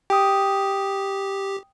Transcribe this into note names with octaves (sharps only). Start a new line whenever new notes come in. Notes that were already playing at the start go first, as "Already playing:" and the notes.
G4 G5 D#6